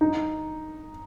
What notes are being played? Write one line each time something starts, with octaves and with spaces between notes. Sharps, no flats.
D#4